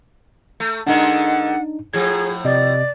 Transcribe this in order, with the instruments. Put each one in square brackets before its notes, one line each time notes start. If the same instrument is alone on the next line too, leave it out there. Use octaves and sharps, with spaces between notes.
[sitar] A3
[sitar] D3 G#3 A#4 [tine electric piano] D4 D#4 [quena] F#5
[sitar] A2 F3 [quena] G#4 [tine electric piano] G#6
[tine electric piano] C3 D#5 [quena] D5